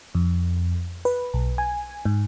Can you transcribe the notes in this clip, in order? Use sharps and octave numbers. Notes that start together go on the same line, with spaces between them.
F2
B4
B1
G#5
G#2